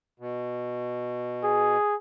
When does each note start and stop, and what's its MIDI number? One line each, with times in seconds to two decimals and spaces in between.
0.20 1.77 47
1.44 1.95 68